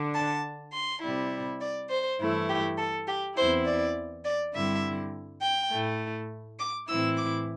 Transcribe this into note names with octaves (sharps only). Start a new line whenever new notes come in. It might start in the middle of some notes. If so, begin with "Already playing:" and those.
Already playing: D3 D4
A5
C6
C3 G3 E4
D5
C5
G2 E3 A3 E4
G4
A4
G4
E2 E3 C4 E4 C5
D5
D5
G2 D3 G3 C4 E4 E5
G5
A2 A3 E4
D6
A2 E3 C4 E4 E6
D6